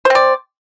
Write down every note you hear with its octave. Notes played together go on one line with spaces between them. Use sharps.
C4 C5 D5